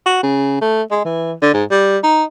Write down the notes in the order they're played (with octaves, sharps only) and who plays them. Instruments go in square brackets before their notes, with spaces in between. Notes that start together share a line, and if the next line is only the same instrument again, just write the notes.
[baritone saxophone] F#4
C#3
A3
G#3
E3
D3
G#2
G3
D#4